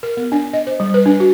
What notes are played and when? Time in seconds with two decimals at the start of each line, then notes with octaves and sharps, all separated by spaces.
0.03 A#4
0.17 B3
0.32 D4
0.53 D#5
0.67 C5
0.80 G3
0.94 B4
1.06 D4
1.20 F#4